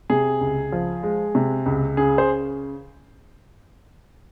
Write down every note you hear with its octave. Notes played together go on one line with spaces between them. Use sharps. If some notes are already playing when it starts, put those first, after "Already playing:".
C3 G#4
C#2
F3
G#3
C3
C#2
C#3 G#4
C5